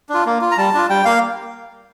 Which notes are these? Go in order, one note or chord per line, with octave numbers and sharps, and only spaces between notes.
D4 F4
A#3
F4
A#5
G3 A5
D4 F4
G3 G5
A#3 F5